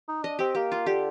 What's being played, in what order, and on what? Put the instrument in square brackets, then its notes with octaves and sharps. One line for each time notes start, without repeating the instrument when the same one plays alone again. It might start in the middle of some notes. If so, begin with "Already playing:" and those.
[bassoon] D#4
[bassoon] D4 [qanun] D#5
[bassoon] C4 [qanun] G4
[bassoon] A#3 [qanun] G4
[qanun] F4
[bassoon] D3 [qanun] G4